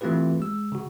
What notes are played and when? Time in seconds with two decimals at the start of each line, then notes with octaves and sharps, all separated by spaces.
0.01 E3 A3 C4 F4 G4 B4
0.40 G#3 E6
0.72 C#3 F#4